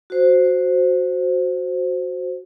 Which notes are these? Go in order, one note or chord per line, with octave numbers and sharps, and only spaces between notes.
F#4 C5